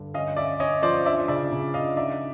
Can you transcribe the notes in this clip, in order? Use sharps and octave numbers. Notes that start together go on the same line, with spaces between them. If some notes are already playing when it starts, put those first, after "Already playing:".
Already playing: G2 D3
C#4 D#5 F5
C#4 D5 E5
C#4 C#5 D#5
F3 C5 D5
D4 D5 E5
C#3 D5 E5
C#3
D4 D#5 F5
D#4 D5 E5